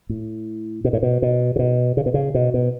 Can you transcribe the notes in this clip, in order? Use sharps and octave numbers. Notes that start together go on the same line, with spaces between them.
A2
B2
A2
B2
B2
C#3
B2
C#3
B2
C#3
B2
B2